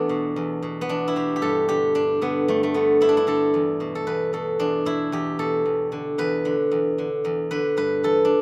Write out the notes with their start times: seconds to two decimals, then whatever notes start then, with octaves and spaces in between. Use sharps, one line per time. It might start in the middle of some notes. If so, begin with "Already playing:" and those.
Already playing: E2 A3 B3 D4
0.09 B2
0.36 E2
0.62 B2
0.81 B3
0.89 E2 D4
1.08 E4
1.16 B2 G4
1.36 G4
1.42 G2 A4
1.68 D3 G4
1.95 G2 D4
2.21 D3 B3
2.48 G2 A3
2.63 A3
2.74 D3 B3
3.01 G2 E4
3.09 D4
3.17 E4
3.27 D3 A4
3.54 E2
3.80 B2
3.95 A4
4.07 E2 B4
4.33 B2 A4
4.59 E2 D4
4.85 B2 E4
5.12 E2 G4
5.39 B2 A4
5.66 E2
5.92 D3
6.18 E2 B4
6.45 D3
6.71 E2
6.98 D3
7.25 E2
7.51 D3 B4
7.77 G2 B4
8.03 E3 A4
8.25 D4